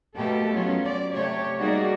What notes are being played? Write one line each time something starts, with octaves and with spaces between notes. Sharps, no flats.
B2 A3 A#3 G4 A4
F#3 B3 C#4 F4
D5
C3 A3 G4 C#5
G3 A#3 D#4 F#4 G#4 D5